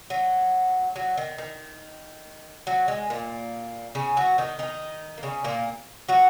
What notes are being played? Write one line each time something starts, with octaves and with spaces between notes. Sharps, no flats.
F#3
F#3
D#3
D#3
F#3
G#3
A#2 A#3
C#3 C#4
F#3 F#4
D#3 D#4
D#3 D#4
A#3
C#3 C#4
A#2 A#3
F#3 F#4